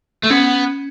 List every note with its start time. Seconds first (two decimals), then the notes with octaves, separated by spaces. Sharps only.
0.23 A3
0.30 B3 C#4